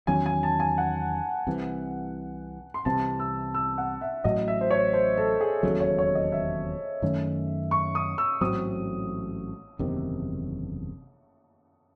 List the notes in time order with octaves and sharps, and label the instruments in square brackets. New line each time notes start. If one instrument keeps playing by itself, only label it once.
[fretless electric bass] E2 D#3 F#3 C#4 [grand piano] G#5
[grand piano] G#5
A5
G#5
F#5
[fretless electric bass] C2 C3 E3
[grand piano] C6
[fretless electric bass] C2 C3 E3 C4 [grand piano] A5
[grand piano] E6
E6
F#5
E5
[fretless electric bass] A1 A2 F#3 [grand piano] D#5
[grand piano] E5
C5
C#5
C5
A4
G#4
[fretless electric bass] E1 D#2 C#3 F#3 [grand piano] A4
[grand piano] C#5
C#5
D#5
E5
[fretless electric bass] F#2 D#3 A3 C#4
[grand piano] C#6
D#6
E6
[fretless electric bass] A1 G#2 F#3 C4 [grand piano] D#6
[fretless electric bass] F#1 E2 C3 D#3